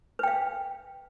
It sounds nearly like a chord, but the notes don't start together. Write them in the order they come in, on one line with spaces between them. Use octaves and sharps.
B4 G5 F5